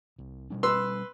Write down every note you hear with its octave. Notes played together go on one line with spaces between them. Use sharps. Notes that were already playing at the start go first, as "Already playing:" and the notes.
C2
B2 G3 D4
B4 C6 E6